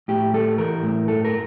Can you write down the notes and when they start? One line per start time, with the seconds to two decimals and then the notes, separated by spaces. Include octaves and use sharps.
0.08 A2 G4
0.34 G3 A4
0.58 E3 A#4
0.83 A2
1.08 G2 A4
1.25 A#4